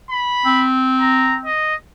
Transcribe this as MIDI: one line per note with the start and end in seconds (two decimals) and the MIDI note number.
0.10 0.66 83
0.46 1.47 60
1.00 1.36 82
1.45 1.75 75